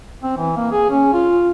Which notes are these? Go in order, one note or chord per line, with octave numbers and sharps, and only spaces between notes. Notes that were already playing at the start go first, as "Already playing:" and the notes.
C4
E3
A#3
G#4
C#4
F4